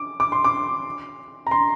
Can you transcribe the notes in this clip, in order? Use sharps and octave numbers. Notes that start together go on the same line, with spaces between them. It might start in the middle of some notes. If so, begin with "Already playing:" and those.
Already playing: D6
D6
C6
D6
A#5
C6